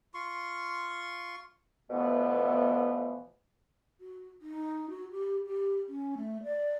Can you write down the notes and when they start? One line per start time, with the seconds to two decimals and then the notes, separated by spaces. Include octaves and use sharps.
0.14 F4 C6 C#6
1.90 B2 D3 E3 F3 A3 B3
4.00 F#4
4.42 D#4
4.90 F#4
5.12 G4
5.46 G4
5.88 C#4
6.17 A3
6.44 D5